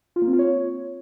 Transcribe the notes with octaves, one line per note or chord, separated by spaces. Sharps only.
F4
A#3
C4
F4
C#5